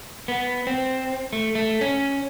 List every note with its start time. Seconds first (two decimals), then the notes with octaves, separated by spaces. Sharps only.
0.28 B3
0.67 C4
1.33 A3
1.55 A3
1.81 C#4